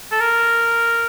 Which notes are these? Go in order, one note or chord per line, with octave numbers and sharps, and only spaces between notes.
A4
A#4